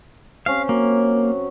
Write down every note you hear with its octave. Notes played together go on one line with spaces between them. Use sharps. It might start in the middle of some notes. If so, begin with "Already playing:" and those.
C4 C#4 G4 F5
F#3 A#3